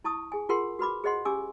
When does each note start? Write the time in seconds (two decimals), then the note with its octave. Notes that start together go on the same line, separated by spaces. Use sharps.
0.04 E4 A5 C#6 D#6
0.32 G#4 G#5
0.49 F4 G#4 A#4 F#5 C6
0.79 F#4 B4 B5 D6
1.04 G#4 C5 D#5 F#5 C6
1.25 C#4 G4 G#5 D6 E6